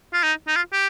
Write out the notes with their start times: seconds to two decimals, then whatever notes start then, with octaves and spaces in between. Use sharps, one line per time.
0.13 F4
0.23 D#4
0.48 D#4
0.56 F4
0.73 G4